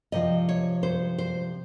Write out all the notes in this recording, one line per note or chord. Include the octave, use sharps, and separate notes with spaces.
C3 F3 D#5
C#5
C5
C5